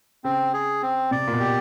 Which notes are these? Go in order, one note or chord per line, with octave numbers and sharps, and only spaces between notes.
C#3 C4
G#4
C4
C3 D5
A#2
B2
G4